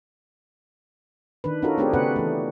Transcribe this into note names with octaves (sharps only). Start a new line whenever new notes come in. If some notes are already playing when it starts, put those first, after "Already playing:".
D#3 D4 B4
C#4 D#4 F4 F#4 A4 A#4
A3 C4 D4 G4 G#4 A#4
C#3 B3 D4 F#4 B4 F#5
E3 A3